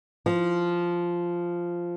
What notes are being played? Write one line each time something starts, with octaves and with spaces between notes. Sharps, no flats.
F3